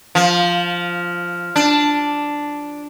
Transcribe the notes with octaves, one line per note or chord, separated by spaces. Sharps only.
F3
D4